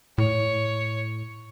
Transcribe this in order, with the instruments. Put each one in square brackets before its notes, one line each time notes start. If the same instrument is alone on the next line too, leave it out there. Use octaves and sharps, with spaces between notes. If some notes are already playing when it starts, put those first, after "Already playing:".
[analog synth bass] A2 [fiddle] C#5